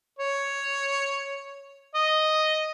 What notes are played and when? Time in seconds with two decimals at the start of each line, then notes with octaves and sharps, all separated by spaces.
0.19 C#5
1.95 D#5